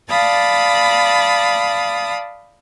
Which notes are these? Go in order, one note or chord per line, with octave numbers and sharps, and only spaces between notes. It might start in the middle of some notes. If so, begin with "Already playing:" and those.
D5 F5 A5 B5 D#6 A6